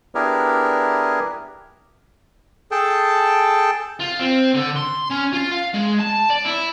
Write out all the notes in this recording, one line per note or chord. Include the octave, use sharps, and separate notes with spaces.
B3 D4 E4 G4 G#4 A#4
G#4 A4 G5 A5
F4
C4
D3
C6
C#4
F4
F5
G#3
A5
D5
E4